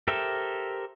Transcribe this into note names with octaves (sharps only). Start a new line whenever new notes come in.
G4 A4 A#4 C5 E5